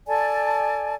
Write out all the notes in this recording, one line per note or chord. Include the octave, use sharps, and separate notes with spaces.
A4 D5 G#5 A5